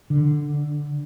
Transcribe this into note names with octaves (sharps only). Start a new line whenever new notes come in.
D3